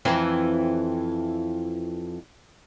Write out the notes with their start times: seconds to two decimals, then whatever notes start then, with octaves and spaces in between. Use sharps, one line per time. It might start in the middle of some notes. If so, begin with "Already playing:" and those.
0.05 F2 E3 C4